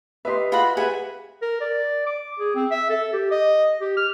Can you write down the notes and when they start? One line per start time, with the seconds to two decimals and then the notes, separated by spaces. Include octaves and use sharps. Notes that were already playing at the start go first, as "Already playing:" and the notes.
0.25 G4 B4 D#5 E5 C6
0.52 F4 F#4 G#4 B5
0.77 G4 G#4 B4 E5 F#5 G#5
1.42 A#4
1.61 D5
2.07 D6
2.39 G#4
2.55 C4
2.71 E5
2.90 A4
3.13 G4
3.31 D#5
3.81 G4
3.97 F6